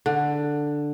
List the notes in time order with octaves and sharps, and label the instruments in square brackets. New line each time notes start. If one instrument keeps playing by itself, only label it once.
[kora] D3